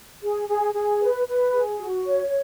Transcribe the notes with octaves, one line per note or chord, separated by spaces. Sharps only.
G#4
G#4
G#4
B4
B4
G#4
F#4
C#5